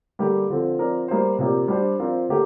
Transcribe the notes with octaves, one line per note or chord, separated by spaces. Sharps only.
D3 G3 A#3 G4
D3 F3 C4
F3 C4 A#4 D5
G3 A#3 G4 C5
C3 F3 A#3 G4 D5
G3 D4 G4 C5
F3 C4 F4 A#4 D5
D3 A#3 G4